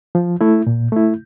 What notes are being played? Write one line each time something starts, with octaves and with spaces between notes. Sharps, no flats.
F3
A3 E4
A#2
A3 E4